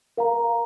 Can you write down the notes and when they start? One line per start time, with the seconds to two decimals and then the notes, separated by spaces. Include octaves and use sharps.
0.17 A#4 F5 A#5